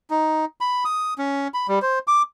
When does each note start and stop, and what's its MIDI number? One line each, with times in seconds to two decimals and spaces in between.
0.10 0.45 63
0.61 0.84 83
0.85 1.14 87
1.18 1.48 61
1.54 1.67 83
1.68 1.79 55
1.82 1.99 72
2.08 2.22 86